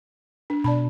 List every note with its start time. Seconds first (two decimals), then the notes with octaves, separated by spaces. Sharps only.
0.50 D4
0.64 B2 D5 A5 B5